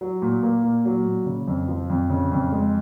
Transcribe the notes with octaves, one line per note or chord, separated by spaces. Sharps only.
F#3
A#2
A#3
A#2
F#3
A#2
C#3
F2
F3
F2
C#3
F2
G#3